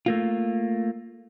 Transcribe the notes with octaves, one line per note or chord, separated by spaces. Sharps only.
A3 A#3 F4